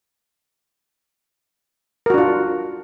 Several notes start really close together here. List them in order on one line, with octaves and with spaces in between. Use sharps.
A#4 F#4 D4 F4